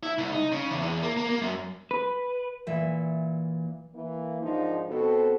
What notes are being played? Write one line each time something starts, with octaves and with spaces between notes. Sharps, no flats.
E4
C2
D#4
C#3
E2
E2
A#3
A#3
A#3
F#2
B4
A#2 E3 E5
E3 A#3
G#2 D#3 F3 D4 D#4
B2 C4 F#4 A4